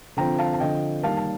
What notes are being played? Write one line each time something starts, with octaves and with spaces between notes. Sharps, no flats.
D3 F3 C4 G5 A#5
F5 A5
A5
D3 F3 C4 D#5 G5
D#3 G3 A#3 F5 A5
A5